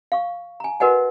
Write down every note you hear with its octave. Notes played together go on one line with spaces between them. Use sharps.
F5 C#6
G#5 A#5
F#4 A#4 B4 D#5 F#5 G#5